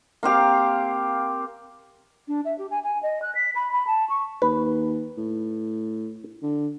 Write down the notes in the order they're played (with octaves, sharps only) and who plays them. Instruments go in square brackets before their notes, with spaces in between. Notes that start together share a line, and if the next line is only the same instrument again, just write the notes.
[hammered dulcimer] A#3 C4 G4 F5
[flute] D4
E5
G4
G#5
G#5
D#5
F#6
B6
B5
B5
A5
C#6
[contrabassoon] D#2 [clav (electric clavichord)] B4
[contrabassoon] A2
D3